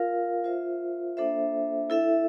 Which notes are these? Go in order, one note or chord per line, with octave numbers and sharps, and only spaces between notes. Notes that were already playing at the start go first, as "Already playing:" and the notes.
Already playing: F4 A#4 F5
F4 C5 E5
A#3 D4 A4 C5 E5
E4 A4 E5